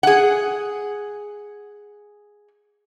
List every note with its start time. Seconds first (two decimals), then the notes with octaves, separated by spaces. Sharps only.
0.03 G#4 F#5